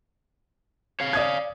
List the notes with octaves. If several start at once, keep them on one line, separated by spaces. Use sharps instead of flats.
C#5 F5
D5 D#6 G#6